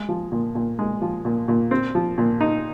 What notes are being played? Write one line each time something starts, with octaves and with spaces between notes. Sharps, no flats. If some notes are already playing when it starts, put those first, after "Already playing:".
Already playing: G#3
F3
A#2
A#2
G#3
F3
A#2
A#2
C4
F3
A#2
D#4